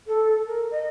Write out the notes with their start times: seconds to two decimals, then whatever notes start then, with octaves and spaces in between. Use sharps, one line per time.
0.07 A4
0.46 A#4
0.71 D#5